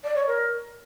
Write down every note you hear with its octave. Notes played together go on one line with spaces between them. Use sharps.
D5
C#5
A#4